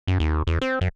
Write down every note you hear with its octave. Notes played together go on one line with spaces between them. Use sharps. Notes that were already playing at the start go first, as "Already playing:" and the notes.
F#2
D#2
E2
C4
F#2